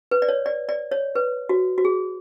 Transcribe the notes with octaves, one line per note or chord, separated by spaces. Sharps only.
B4
D5
C#5
D5
D5
C#5
B4
F#4
F#4
G#4